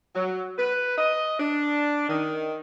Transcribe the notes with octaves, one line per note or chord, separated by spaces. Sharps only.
F#3
B4
D#5
D4
D#3